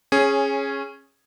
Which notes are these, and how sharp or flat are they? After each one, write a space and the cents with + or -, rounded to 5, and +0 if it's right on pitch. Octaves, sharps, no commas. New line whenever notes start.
C#4 -15 G#4 +0 C#5 +0